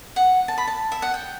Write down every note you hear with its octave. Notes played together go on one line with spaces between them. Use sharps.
F#5
A5
B5
A5
E5
F#5
G5